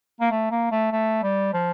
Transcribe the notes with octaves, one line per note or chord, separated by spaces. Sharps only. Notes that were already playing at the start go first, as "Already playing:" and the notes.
A#3
A3
A#3
A3
A3
G3
F3